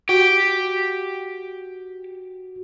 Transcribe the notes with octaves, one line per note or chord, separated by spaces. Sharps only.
F#4 G4